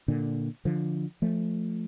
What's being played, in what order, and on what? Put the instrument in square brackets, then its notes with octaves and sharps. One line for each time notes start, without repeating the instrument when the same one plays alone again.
[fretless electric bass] A#2 D3
D3 F3
F3 A3